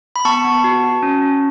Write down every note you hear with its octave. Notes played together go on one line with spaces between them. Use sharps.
B5
B3 A5 C#6
B3
F#4
F#4
C#4
C#4